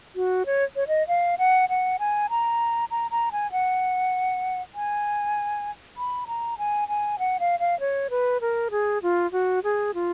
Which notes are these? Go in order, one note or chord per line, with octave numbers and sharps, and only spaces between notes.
F#4
C#5
C#5
D#5
F5
F#5
F#5
G#5
A#5
A#5
A#5
G#5
F#5
G#5
B5
A#5
G#5
G#5
F#5
F5
F5
C#5
B4
A#4
G#4
F4
F#4
G#4
F4